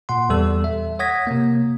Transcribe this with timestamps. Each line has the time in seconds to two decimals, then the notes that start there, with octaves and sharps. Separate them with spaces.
0.09 A#2 F#5 C6
0.29 E2 G3 A4 E6
0.64 E5
0.99 C#5 F#5 D#6 G#6 A#6 B6
1.27 C3 A#3